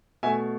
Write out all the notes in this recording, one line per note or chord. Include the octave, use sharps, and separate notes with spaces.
B2 A3 E5 G#5